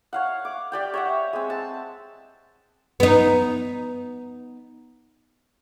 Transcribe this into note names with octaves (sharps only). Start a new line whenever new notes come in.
C#5 F5 F#5
D6
G4 D5 G5
C#5 E5 F#5
G#3 C4
A5
B3 D#4